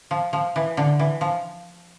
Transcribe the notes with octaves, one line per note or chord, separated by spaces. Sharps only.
F3
F3
E3
D3
E3
F3